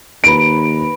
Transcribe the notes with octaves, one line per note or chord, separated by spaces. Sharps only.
D#2 B4 A#5 D7